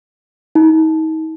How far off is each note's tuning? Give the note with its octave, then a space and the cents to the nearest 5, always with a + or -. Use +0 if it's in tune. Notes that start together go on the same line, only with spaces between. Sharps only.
D#4 +35